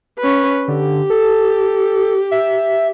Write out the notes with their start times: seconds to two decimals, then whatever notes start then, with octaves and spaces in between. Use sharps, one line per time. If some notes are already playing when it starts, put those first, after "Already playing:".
0.19 C#4 B4
0.68 D3 G4
1.10 A4
2.31 E5